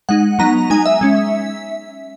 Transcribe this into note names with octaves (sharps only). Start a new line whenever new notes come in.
G#3 D#4 F#5
F#3 B3 D#4 A#5
G#3 D#4 G#5
E5
G#3 C#4